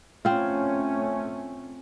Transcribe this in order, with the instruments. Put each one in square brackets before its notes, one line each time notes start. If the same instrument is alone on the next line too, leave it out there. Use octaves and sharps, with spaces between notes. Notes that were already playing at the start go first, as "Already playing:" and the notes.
[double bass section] A3 C#4 [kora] C4 F4